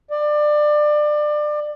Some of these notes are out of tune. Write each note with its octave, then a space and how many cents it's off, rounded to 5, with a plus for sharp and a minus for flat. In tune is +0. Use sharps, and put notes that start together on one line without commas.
D5 +25